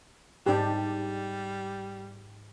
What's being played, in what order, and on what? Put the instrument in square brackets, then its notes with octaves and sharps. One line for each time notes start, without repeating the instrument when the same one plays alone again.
[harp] G#2 [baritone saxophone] G3 [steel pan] D4 G4